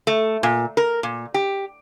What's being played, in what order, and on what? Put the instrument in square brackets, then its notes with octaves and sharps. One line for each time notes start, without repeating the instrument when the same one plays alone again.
[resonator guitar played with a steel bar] A3
A#2
A#4
A#2
G4